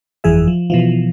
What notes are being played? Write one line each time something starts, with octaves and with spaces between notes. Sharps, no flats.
G1 F2 E3 G#4 E5
F3
B2 E3 F3